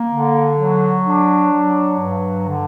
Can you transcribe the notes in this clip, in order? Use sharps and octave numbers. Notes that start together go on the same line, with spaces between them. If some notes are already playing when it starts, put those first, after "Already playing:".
Already playing: A#3
D3
F#3
D4
F#3
G2
D3